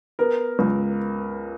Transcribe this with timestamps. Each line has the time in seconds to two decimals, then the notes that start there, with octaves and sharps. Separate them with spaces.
0.19 B3 A#4
0.59 C#2